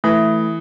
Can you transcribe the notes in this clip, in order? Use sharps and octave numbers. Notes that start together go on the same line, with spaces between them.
E3 A3